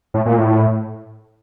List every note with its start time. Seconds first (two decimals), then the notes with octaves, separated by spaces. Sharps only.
0.14 A2
0.26 A#2
0.38 A2